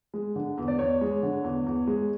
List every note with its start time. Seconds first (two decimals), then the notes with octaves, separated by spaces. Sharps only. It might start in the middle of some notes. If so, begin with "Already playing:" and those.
0.14 G#3
0.36 D3
0.58 E2
0.68 D5
0.79 E2 C#5
1.01 G#3
1.23 D3
1.44 E2
1.66 E2
1.87 G#3